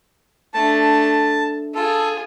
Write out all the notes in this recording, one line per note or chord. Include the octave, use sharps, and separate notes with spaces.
A3 D4 A5
F4 G#4 A4